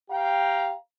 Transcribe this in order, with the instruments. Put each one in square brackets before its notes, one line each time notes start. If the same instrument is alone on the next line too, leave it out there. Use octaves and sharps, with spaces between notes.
[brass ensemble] G4 F5 G5 A#5